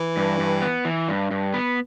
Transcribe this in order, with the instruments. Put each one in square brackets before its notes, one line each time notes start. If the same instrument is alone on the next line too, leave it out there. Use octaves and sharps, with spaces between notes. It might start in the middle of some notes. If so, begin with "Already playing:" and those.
Already playing: [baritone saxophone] E3
[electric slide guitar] G2
G2
B3
E3
G2
G2
B3